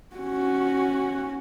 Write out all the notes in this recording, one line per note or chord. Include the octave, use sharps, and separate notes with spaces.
C#4 F#4